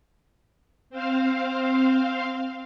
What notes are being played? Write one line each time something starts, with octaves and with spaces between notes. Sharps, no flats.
C4 C5 F5